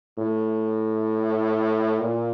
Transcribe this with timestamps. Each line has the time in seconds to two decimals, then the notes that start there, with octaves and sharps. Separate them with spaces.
0.18 A2
2.02 A#2